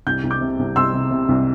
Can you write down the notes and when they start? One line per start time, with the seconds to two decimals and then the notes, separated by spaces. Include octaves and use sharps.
0.07 C2 G6
0.23 C2
0.31 D6 G6
0.41 C3
0.59 C2
0.76 C2 C6 E6
0.93 C3
1.11 C3
1.29 C2